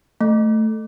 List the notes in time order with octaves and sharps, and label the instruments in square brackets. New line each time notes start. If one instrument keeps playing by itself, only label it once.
[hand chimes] A3